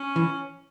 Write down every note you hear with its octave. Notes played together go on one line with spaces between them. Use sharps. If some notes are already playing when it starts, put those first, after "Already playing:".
Already playing: C#4
E3